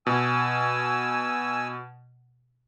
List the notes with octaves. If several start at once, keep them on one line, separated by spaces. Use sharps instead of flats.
B2 G#5 E6